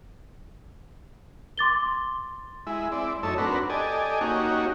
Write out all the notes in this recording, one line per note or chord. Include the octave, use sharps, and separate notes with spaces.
C6 D6 A6 G7
G#3 E4
C4 E4 D5
F#2 A3 D#4 A4 C#5 E6
C4 D4 F#4 A#4 B4
G4 A4 D5 D#5 G#5
A#3 C#4 D#4 F#4 G4